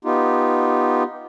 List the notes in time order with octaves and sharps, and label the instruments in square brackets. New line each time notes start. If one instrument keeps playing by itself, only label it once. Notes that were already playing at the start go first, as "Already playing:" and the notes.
[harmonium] B3 D#4 F4 G4